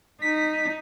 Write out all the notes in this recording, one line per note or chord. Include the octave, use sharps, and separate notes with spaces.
D#4 B6